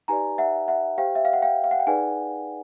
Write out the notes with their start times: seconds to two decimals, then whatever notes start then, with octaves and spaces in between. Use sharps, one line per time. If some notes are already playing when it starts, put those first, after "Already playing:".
0.08 D#4 G4 B4 D5 G#5 A#5
0.38 E5 F#5
0.68 E5 F#5
0.98 G4 C5 F5 G5
1.15 E5
1.25 F5
1.33 F#5
1.42 F5 G5
1.64 F5
1.71 F#5
1.80 G5
1.87 D#4 G#4 B4 D5 F#5 G#5